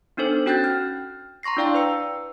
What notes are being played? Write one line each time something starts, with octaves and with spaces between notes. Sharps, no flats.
B3 D4 D#4 A4 C5
C#4 F#4 G5 F#6 G6 A6
F6
A#5 C6 C#6 A#6 C7
D4 E4 D5 F5 G5 A#5
B4 A#5 E6 C#7